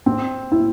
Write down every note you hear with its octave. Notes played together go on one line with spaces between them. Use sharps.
C4
E4